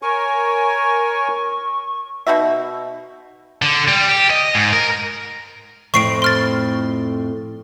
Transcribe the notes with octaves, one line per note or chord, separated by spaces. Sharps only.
A#4 C#5 G#5 C#6
B2 D#4 F#4 E5
D3
G3
G4
D#5
G#2
A#4
F2 A2 C4 C#6 C7 D7
C6 F6 A6